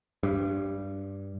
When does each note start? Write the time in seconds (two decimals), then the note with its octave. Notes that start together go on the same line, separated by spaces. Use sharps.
0.23 G2